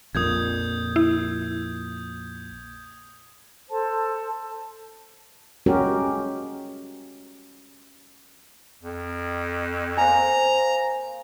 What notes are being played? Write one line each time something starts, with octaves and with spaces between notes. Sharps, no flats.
A#1 F2 A#2 D#6 G6 G#6
E4
A4 C5 A5
G#3 C#4 F#4 G4 A#4
F2
A#3 C5 F5 G#5 A#5